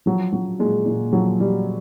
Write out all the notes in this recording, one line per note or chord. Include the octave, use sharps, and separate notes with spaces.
F3 F#3
F3 F#3
A#2 G#3
A#2
F3 F#3
F3 G3